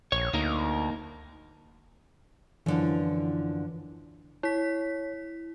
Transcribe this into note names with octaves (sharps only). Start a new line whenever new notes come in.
A#1 C#5
D2 A#3 D#4 A#4
F#2 D3 E3 F3
E4 C#5 B6